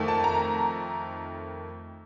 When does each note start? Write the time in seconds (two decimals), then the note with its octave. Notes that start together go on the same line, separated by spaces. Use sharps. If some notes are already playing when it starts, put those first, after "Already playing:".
Already playing: F2 D#3 A3
0.08 A5
0.24 A#5